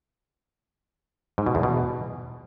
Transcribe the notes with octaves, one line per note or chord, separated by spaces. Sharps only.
G#2
B2
E2
B2